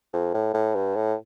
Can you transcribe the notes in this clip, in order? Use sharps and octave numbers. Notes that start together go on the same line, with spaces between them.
F2
A2
A2
G2
A2